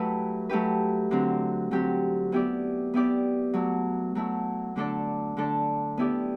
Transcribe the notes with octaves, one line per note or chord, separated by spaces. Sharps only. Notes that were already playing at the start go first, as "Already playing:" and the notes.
Already playing: F#3 A3 E4 G4 A4 B4
F#3 A3 E4 G4 B4
D3 F#3 C4 G4
D3 F#3 C4 G4
B3 E4 G4 D5
B3 E4 G4 D5
F#3 A3 E4
F#3 A3 E4
D3 A3 D4 A4 D5
D3 A3 D4 A4 D5
B3 E4 G4 D5